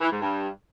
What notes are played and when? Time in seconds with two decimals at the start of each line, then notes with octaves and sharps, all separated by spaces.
0.01 E3
0.11 G#2
0.22 G2